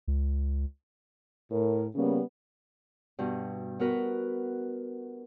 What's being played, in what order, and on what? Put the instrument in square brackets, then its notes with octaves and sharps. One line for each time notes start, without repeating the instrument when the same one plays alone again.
[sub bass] C#2
[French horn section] A2 A#4
C#3 G3 A#3 B3 C#4
[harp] G2 B2
B3 F#4 A#4 B4